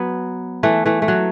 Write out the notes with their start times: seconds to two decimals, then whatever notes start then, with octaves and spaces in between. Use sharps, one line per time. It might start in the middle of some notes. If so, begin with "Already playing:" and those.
Already playing: F#3 B3
0.63 E3 A3
0.86 E3 A3
1.02 A3
1.08 F#3